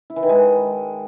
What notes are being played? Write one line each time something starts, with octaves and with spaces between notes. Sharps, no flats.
E4
E3
D#3
G#3